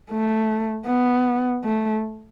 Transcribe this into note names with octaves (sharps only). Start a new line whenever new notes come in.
A3
B3
A3